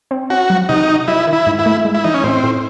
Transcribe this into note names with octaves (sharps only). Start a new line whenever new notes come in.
C4
C#4 F#4
F#3
C3 D#4
F#4
F#3 E4
D#3
E4
G#2
E4
A3
G#3
E4
E3 D#4
C#4
A2 C4
A2